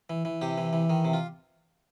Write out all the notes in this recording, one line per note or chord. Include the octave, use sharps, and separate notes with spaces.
E3
E3
C3 G4
E3
E3
D#3
C3
F4